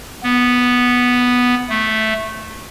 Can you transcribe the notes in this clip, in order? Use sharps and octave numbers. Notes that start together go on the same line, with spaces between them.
B3
A3